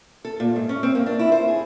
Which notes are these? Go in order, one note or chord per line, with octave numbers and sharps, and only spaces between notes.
A4
A#2
G#2
C#4
C4
A#3
D4
E4
C5
G#4